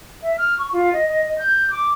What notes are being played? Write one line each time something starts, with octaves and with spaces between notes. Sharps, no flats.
E5
F6
C#6
F4
D#5
D#5
D#5
G6
D6